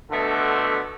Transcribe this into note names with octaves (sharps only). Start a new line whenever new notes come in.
B2 D3 A3